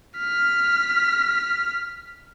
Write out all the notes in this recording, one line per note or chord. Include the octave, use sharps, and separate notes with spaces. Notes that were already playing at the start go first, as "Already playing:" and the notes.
F6 B6